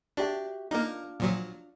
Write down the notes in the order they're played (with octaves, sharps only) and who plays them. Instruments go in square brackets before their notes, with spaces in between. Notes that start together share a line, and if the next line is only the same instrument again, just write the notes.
[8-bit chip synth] D4 [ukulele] F#4 G4 E5
[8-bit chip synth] A#3 D#4 [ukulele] D4 F4
[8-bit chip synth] A#2 F3 F#3